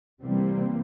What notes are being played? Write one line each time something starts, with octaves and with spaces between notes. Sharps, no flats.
C3 E3 G3 A#3 C4